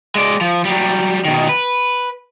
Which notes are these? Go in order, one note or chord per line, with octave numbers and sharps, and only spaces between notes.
G#3 D5
F3
F#3 G3
B2 D#3
B4